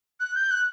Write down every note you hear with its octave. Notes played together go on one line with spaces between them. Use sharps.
F#6
G6
F#6